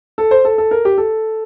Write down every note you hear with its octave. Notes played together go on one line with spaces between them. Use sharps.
A4
C5
A4
A4
A#4
G4
A4